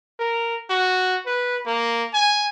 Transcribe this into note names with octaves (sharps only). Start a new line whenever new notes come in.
A#4
F#4
B4
A#3
G#5